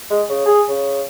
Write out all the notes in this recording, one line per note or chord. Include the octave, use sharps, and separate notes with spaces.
G#3
C#3
G#4
C#3